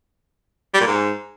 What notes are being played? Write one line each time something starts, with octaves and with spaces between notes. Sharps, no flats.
G3
A#2
G#2